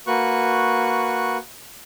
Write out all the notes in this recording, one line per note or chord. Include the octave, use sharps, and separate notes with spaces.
A#3 F#4 B4 C#6 F#6